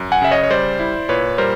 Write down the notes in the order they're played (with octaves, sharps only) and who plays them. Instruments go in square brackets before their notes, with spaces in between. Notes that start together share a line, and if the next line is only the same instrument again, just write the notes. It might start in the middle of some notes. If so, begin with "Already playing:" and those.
Already playing: [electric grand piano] F#2
F#5 G#5
C#3 E5
C#5 D#5
C#5
G3 C5 D5
E4
A#2 B4 C#5
G3 A#4 C5